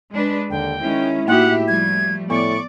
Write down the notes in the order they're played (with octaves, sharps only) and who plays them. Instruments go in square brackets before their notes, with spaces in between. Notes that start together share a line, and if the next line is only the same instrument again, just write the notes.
[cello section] G#3 D4 B4
[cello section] D#2 [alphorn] D3 [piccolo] G5
[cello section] D#3 G#3 C#4 [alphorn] E4
[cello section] A2 G4 E5 [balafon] A#3 D#4 F#4 [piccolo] F#5
[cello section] F3 G3 A3 [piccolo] G#6
[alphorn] A2 [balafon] B3 [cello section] D5 [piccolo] C#6